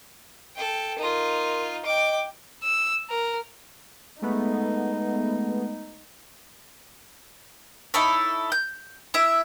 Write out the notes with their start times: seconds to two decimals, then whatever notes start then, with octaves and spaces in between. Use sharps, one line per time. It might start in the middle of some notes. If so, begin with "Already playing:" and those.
0.56 A4 G5
0.99 D#4 F4 A#4 C6
1.85 D#5 G5 D6
2.63 E6
3.09 A#4
4.22 G#3 A3 B3 D#4
7.94 D#4 E4 A4 C#5
8.52 G6
9.14 E4 E5